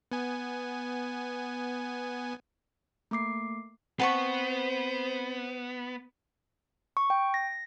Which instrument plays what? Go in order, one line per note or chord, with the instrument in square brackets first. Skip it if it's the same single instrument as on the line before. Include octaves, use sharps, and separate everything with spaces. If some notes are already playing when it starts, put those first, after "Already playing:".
[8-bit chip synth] B3 G#5
[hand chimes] A3 A#3 D6 C7
[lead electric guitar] B3 [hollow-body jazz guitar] C4 B4 [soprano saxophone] C5 [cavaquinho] F#5 A5 C#6
[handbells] C#6
G5
A#6